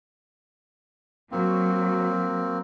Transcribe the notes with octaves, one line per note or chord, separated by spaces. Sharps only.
F#3 A#3 C4